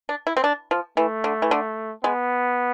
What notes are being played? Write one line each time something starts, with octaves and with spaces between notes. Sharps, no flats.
D4
E4
C4
D4
F3
E3 A3
D3
E3
D3
G#3 B3